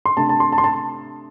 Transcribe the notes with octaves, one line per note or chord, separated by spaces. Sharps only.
C6
C3 A3 D4 A5
A5
C6
A5
C6
A5